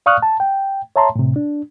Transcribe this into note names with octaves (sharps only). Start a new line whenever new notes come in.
D5 F5 C#6 D#6 F6 F#6
A5
G5
C#5 E5 A5 A#5 C6
A2 C3
D4